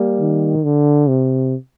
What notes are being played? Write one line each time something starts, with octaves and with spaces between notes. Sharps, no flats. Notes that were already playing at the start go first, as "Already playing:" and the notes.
Already playing: G3 A#3
D#3
D3
C3